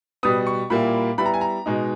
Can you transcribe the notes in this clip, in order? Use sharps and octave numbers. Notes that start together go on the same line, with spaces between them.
B2 G3 B3 D#6
C#6
A#2 G3 A#3 E4 B5
G3 B3 E4 B5
A#5
G#5
A#5
B2 G#3 D#4